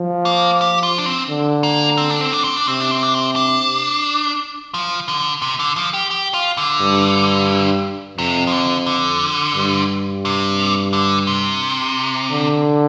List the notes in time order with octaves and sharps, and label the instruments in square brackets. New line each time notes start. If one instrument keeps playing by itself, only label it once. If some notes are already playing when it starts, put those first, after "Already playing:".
Already playing: [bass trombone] F3
[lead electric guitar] A#3
G4
F4
D4
C4
[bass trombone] D3
[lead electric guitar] A#3
C4
D4
C4
D4
C4
D4
[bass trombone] C3 [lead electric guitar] C4
[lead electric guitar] D4
C4
D4
C4
D4
F3
D3
C3
D3
F3
G4
G4
F4
D3
[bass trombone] G2
[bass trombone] F2 [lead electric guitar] C3
[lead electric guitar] F3
D3
D3
[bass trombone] G2
[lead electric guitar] C3
D3
C3
[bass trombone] D3